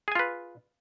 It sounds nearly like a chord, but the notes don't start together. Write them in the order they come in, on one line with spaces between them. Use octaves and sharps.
G#4 G#5 F4 B4